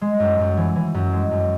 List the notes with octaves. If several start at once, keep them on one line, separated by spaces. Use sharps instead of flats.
G#3
F#2
F#2
E3
E3
F#2
G#3
F#2